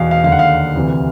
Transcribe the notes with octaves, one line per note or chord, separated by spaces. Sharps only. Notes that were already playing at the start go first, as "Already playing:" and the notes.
Already playing: E2 B2 F5
F5
D#2 D3 F5
F#5
F5
D2 C3 E3